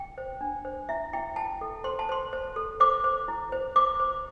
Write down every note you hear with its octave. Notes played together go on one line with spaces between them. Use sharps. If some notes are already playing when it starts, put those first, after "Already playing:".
Already playing: G5
C5
D4
C5
E4 E5
E4 G5
E4 A5
A4
C5 C6
A5
C5 C6
C5
A4
C5 D6
C5
E4
C5
C5 D6
C5